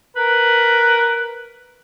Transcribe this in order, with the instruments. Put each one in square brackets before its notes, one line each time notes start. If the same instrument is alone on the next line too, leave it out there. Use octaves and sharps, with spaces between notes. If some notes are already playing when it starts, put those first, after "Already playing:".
[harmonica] A#4 B4